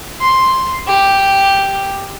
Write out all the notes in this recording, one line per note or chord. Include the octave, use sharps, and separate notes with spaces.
C6
G4